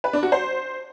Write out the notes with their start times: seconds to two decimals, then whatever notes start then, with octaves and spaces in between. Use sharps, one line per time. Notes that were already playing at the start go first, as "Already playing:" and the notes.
0.04 B4
0.13 D4
0.23 F#4
0.32 C5